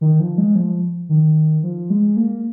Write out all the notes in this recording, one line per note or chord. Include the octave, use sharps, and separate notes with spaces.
D#3
F3
G#3
F3
D#3
F3
G#3
A#3